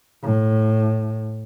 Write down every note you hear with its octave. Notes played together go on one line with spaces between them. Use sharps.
A2